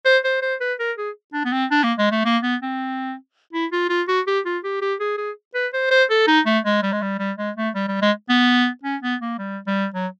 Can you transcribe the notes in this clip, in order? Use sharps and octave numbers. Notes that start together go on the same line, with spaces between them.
C5
C5
C5
B4
A#4
G#4
D4
B3
C4
D4
A#3
G#3
A3
A#3
B3
C4
E4
F4
F4
F#4
G4
F4
G4
G4
G#4
G#4
B4
C5
C5
A4
D#4
A3
G#3
G3
G#3
G3
G3
G#3
A3
G3
G3
G#3
B3
C#4
B3
A#3
G3
G3
F#3